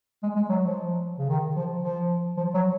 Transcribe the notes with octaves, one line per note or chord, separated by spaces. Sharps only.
G#3
G#3
F#3
F3
C#3
D#3
F3
F3
F3
F#3